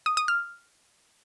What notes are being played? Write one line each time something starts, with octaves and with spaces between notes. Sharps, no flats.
D#6
D#6
F6